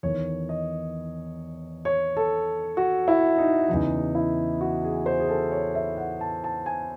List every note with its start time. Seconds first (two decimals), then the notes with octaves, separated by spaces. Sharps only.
0.03 E2 D#3 C#5
0.49 D#5
1.85 C#5
2.17 A4
2.77 F#4
3.08 E4
3.38 D#4
3.68 E2 C#3 E3 D#4
4.15 E4
4.61 F#4
4.84 G#4
5.06 C5
5.19 G#4
5.29 A4
5.51 C#5
5.75 E5
5.97 F#5
6.21 A5
6.44 A5
6.66 G#5